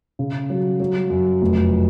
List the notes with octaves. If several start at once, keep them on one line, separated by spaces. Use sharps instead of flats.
C#3
F#3
F#3
F#2
F1
F3